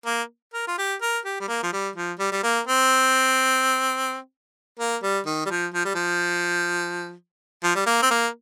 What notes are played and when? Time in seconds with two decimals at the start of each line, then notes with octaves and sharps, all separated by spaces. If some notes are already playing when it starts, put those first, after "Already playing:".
0.06 A#3
0.54 A#4
0.68 F4
0.78 G4
1.02 A#4
1.25 G4
1.41 G3
1.48 A#3
1.63 F3
1.73 G3
1.96 F3
2.19 G3
2.32 G3
2.43 A#3
2.67 C4
4.80 A#3
5.03 G3
5.26 D#3
5.46 G3
5.50 F3
5.74 F3
5.85 G3
5.95 F3
7.64 F3
7.75 G3
7.86 A#3
8.02 C4
8.11 A#3